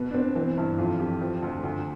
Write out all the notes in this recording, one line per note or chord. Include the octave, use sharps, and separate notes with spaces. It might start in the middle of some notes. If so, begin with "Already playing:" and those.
Already playing: B2 B4
D4
B2 C4
E3 C4
G2 E4
F2 F4
F2 G4
F3
D2
D2